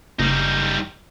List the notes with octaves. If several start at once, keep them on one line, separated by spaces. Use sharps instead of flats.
F#1 G3 D#4